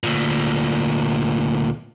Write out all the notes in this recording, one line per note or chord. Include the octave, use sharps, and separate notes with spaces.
D2 A#2